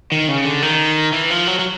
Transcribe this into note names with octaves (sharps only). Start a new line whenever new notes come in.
D#3
C#3
D3
D#3
E3
F3
F#3
F#3